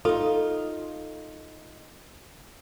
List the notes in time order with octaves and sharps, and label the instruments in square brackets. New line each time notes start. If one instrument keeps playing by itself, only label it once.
[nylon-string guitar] D#4 F4 [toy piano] A4